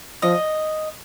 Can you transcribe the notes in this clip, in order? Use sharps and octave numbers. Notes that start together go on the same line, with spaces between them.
F3 D#5